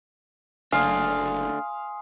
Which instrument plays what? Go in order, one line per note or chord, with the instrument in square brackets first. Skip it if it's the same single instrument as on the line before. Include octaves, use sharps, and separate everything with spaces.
[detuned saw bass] F#1 [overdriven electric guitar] A3 D4 [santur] F5 [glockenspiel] G#5 C6 D#6